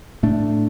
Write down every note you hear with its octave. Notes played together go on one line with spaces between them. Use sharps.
A2 A3 D4